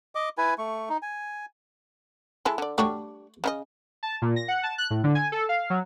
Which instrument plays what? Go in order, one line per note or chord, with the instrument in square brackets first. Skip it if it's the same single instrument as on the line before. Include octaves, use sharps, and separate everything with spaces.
[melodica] D#5 D6
E4 B4 G#5
A3 C#6
D#4
G#5
[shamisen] G#3 E4 A4
D3 D5
[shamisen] G3 D4 [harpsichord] A3 F#4 C#5
[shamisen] C#3 D#4 D#5
[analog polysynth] A5
A#2
A#6
F#5
A5
F#6
A2
D3
G#5
A4
F5
F#3